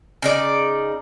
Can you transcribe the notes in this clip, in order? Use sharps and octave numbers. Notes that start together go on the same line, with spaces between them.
C#3 D#4 D5